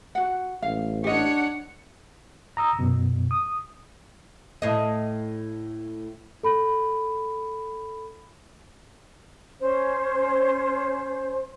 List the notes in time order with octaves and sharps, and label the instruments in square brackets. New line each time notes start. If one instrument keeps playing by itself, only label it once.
[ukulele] F#4 F#5
[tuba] A1 [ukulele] F5
[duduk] D4 [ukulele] G4 D#5 [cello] C#5 F#5
[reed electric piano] A#5 D#6 E6
F#2 B2
D#6
[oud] A2 D#5
[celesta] A4 B5
[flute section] C#4 C5